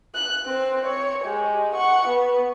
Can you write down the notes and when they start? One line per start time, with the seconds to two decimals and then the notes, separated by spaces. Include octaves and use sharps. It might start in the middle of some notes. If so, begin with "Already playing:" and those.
0.15 F#6
0.46 C4 C5
0.85 C#5
1.23 G#3 G4
1.75 F#5 C#6
2.08 B3